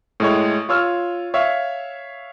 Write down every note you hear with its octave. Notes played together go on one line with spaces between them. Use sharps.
A2 G#3 C#5
F4 C#5 E6 F6
C#5 E5 F5